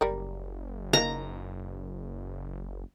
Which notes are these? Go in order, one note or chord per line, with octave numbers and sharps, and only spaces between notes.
F#1 G3 A#4 D5
D#3 A#3 A#5